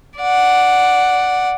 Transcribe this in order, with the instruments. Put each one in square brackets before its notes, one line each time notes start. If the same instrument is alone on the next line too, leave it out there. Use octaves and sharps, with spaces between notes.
[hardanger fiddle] D5 F#5